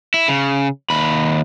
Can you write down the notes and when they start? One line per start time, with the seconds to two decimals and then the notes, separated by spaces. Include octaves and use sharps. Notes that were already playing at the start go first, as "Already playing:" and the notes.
0.14 E4
0.28 C#3
0.90 D#2 B5